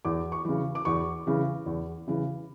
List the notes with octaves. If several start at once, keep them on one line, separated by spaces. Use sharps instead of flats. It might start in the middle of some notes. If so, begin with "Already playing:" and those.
E2 D6
C#6
C#3 E3
D6
E2 C#6
C#3 E3
E2
C#3 E3